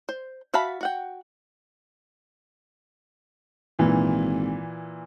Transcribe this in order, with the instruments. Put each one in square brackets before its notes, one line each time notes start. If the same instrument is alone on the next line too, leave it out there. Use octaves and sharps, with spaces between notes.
[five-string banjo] C5
F#4 E5 F5 A5 B5
F#4 F#5 G5
[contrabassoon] G#1 [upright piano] A#2 E3